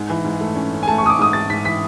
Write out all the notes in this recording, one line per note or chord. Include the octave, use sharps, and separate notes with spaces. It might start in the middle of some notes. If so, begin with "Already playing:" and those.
Already playing: G#2
E3
G#2
A3
C#4
C#4
G#5
A3 A5
C#6
A3 D#6
D6
G#2 D#6
G#2 A6
G#2 B6
E3 B6